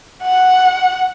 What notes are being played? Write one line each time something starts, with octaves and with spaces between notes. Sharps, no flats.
F#5